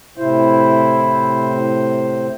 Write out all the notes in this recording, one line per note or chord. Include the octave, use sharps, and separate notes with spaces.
A2 C3 E4 C5